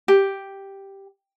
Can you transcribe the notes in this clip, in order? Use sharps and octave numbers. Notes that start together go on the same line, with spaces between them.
G4